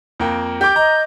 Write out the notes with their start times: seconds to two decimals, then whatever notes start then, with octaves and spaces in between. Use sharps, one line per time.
0.20 F2 A#3 G5
0.61 G4 D6 G6
0.76 D#5 A#5